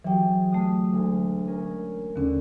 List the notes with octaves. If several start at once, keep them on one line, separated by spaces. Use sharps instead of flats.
E3 F#3 G4 G#4 G5
D3 A3 D#6 B6
D2 G#3
C#4 A#4
D#2 D3 C#4